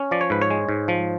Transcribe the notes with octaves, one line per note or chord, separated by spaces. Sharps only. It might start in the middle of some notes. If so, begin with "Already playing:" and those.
Already playing: C#4
F3 D5
C#5
G#2 B4
C#5
G#3
G#2
F3